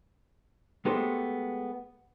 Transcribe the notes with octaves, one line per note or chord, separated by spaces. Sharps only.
G#3 A3 B3 G4 A4 C5